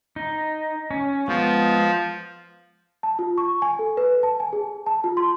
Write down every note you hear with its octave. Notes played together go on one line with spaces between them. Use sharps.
D#4
C#4
F3 G#3 B3
A5
F4
C#6
G#5
A4
B4
A5
G#5
G#4
A5
F4
C6